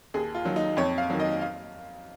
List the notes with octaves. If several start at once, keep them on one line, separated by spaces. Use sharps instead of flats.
D#2 G#4
F4
D#3 F#3
D#4
F2 C#5
F5
D#3 F#3
D#5
F5